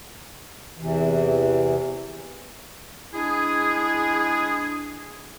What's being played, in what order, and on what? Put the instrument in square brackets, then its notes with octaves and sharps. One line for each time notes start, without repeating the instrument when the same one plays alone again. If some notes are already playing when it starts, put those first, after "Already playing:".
[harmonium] E2 C3 E3
[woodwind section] G#3 D4 E4 G#4